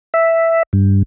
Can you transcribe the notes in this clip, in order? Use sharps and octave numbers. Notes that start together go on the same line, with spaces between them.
E5
G2